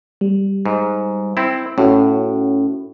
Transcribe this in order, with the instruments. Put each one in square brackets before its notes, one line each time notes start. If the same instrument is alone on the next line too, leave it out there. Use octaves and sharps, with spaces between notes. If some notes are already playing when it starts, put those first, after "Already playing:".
[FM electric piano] G3
[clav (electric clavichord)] G#2
C4 E4
[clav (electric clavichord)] A2 [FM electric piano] C#4 F#4